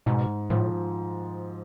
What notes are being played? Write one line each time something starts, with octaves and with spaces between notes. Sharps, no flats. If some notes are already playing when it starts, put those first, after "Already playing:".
G#2 B2
A2 F3